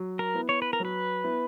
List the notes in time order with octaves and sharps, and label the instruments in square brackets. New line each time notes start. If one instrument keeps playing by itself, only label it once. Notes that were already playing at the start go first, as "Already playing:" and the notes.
Already playing: [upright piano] F#3
[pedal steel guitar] A#4
[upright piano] B3 E4
[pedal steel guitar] C#5
B4
A#4
[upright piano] F#3 [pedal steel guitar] B4
[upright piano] B3 E4